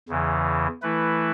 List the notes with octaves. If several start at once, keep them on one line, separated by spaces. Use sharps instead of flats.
E2 C#3 E3
E3 A3 E4 B4